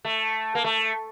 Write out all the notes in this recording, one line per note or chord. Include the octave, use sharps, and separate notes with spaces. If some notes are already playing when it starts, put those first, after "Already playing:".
A3
A#3
A3